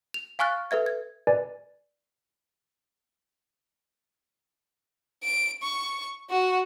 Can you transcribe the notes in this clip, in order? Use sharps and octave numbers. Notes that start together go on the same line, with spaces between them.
F7
F5 G#5 C#6 F6 F#6 A6
A4 B4 E5 G#6
G#6
B4 D5 G#5
D7
C#6
F#4